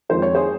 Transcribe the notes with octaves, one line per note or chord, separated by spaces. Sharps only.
F2 D#3 G#3 C5
C#5
G#4 C5